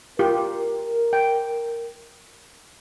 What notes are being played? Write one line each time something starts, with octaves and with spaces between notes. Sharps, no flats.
F4 G4 A#4
G5